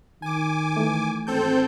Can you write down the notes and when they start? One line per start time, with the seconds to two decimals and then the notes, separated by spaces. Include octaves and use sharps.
0.22 D#3 G#5 D6
0.76 E3 A3
1.27 G#1 C4 A4 G6